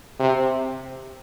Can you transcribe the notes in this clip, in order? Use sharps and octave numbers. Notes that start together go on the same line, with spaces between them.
C3